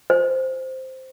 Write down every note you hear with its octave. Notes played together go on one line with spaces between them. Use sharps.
C5